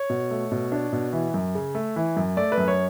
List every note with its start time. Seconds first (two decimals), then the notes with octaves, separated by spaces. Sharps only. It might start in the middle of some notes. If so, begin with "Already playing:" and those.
Already playing: C#5
0.10 B2
0.31 A3
0.52 B2
0.72 D4
0.93 B2
1.13 E3
1.34 F#2
1.55 C#3
1.75 A3
1.96 E3
2.17 F#2
2.37 A3 D5
2.52 B4
2.58 F#2
2.68 C#5